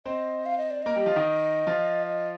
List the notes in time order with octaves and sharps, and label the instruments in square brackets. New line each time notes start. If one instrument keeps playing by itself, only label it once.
[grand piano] C4 C5 [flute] D#5
[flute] F5
D#5
D5
[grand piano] A#3 A#4 [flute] D#5
[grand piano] G3 G4
F3 F4
D#3 D#4
F3 F4
[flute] D#5